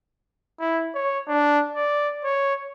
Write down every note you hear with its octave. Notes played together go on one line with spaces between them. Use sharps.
E4
C#5
D4
D5
C#5